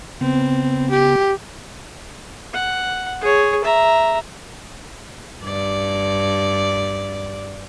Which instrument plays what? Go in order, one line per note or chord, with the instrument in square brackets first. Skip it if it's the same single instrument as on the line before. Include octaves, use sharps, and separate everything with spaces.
[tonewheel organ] C#3 B3 [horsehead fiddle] C4
[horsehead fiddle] G4
[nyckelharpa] F#5
G#4 C#5
E5 A#5
[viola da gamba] G2 D5